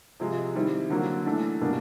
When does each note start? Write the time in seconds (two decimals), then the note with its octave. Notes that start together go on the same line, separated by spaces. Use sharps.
0.20 C3 F3 G#3
0.55 D#3 G3 C4 E4
0.90 D3 F#3 A#3
1.26 E3 A3 D4
1.61 B2 G3 A#3 D4